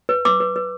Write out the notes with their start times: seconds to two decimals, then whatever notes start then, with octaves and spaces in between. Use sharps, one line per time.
0.09 B4
0.25 B4 D6
0.40 B4
0.56 B4